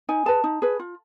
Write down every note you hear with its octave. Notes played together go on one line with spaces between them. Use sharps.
D#4 G#5
G#4 B4 A5
D#4
G#4 B4
F4